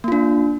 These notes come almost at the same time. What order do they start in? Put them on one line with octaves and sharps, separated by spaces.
A#3 F4 D4